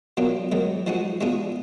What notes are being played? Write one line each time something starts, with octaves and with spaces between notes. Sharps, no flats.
B2 F#3 A#3 D4 F4
G#2 D#3 F#3
F3 G#3 D#4 F#4
B2 G#3 D4 F4 G#4